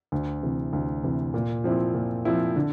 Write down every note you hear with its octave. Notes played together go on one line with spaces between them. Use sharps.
D2
C3 E3
D2
C3 E3
A#2
F3 C4 E4
A#2
F3 C4 E4
D3